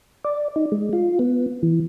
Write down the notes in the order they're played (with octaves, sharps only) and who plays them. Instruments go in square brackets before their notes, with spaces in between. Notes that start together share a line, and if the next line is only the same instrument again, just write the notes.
[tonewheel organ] D5
D#4
G#3
F4
B3
E3